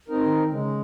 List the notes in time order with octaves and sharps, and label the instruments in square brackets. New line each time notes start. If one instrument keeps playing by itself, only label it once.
[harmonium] C4 D#4 A#4
[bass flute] D#3
[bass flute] C#3 [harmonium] G#3